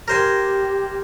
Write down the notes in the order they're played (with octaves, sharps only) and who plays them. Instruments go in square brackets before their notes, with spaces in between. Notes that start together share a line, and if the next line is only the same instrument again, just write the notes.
[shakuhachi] G4 [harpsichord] A#4 C5 G#5